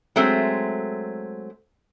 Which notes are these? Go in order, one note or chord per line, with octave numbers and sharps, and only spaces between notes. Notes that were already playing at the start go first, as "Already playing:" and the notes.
F#3 G#3 A3 C4